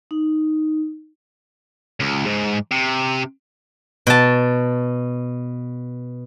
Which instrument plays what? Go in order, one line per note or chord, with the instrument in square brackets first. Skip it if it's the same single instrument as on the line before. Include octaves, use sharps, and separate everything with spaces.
[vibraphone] D#4
[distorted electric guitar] C#2
G#2
C3
[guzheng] B2 A5